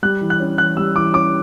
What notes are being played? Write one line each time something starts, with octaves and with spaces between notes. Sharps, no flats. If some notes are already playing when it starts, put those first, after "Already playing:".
G3 F#6
E3
F#6
C#4
E3 F#6
G3 E6
E3 D6
C#4 D6